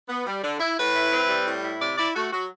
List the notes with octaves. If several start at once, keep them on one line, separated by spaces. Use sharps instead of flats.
B3
G3
D3
E4
A2 B4
E4
C4
G3
A2
E4
C3 D5
E4 D5
A3 F#4
F#3 F#4